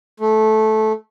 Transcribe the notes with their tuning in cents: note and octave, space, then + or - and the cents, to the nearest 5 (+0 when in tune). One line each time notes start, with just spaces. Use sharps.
A3 -15